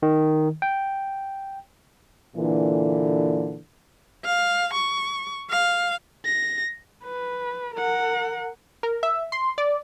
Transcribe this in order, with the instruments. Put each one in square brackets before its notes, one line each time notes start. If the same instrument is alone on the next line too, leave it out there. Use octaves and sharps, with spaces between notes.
[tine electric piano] D#3
G5
[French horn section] A#2 D3 E3
[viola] F5
C#6
F5
[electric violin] A#6
[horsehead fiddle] B4
A#4 F#5
[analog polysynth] A#4
E5
C6
D5